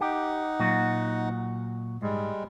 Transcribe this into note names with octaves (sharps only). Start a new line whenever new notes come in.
D#4 G4 F#5
A#2 F#3 F#4
G#2 G3 G#3